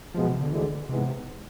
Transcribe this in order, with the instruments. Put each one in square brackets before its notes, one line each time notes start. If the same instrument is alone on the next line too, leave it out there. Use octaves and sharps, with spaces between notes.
[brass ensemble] B2 G#3 B3 [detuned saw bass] F3
[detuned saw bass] C3
D3
[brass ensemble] D2 D3 G#3 [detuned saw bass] E3
[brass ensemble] G#2 E3 G#3 B3 [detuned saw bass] C3